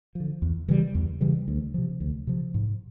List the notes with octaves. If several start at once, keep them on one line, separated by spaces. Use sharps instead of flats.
D3 F3
E2
C#3 E3 G3
E2
C#3 E3 G3
D2
C3 F3
D2
C3 F3
G#2